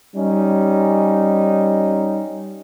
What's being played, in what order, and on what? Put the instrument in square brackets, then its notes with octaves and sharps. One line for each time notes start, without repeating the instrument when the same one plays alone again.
[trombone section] G3 C#4 D#4